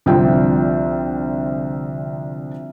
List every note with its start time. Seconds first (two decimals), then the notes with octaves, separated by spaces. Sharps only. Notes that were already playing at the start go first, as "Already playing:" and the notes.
0.06 C2 D3 F3 C4 G5